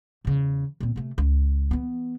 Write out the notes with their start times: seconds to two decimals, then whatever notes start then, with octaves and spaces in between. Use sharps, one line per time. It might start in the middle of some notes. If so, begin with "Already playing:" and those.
0.25 E2 C#3
0.80 A#2 C4
0.96 C3 A3
1.18 C#2
1.71 E3 B3